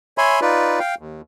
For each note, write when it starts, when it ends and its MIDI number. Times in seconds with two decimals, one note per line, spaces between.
0.18 0.40 73
0.18 0.40 76
0.18 0.40 80
0.18 0.40 83
0.18 0.40 84
0.42 0.79 63
0.42 0.79 65
0.42 0.79 71
0.42 0.79 74
0.79 0.95 77
0.79 0.95 79
0.99 1.21 39